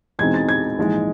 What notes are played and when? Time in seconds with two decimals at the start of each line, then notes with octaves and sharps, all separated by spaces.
0.19 E2 B2 G#3 C4 D#4 G#6
0.34 A6
0.49 G#6
0.78 A#1 G#2 E3 G#3